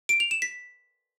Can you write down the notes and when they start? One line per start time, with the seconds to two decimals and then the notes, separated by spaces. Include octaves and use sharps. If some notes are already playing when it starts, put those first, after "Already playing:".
0.09 D7
0.20 F7
0.31 E7
0.42 B6